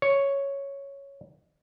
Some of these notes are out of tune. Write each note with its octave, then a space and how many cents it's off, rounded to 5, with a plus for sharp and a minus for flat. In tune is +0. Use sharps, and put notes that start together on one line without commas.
C#5 +0